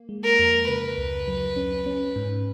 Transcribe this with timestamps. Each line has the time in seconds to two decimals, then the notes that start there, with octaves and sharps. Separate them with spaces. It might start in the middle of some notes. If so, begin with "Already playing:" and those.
Already playing: A#3
0.09 G#3
0.24 A#4
0.39 F2
0.68 C#3 B4
0.97 C#2
1.28 F#3
1.56 C#4
1.86 C#4
2.16 G#2